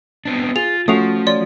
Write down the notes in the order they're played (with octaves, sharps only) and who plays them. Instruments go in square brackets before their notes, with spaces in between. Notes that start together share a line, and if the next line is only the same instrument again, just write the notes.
[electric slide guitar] B3 C4 D4
[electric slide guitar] F4 [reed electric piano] G#4 [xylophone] F7
[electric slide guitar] F3 [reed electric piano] A3 C#4 F#4 [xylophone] D#6 C7 F7
[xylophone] C#5 D5 C6